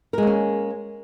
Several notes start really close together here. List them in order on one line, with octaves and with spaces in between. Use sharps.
A#4 G#3 A#3 C#4